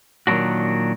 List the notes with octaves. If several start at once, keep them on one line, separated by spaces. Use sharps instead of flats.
A#2 D#3 F#3 C4 D4 F#4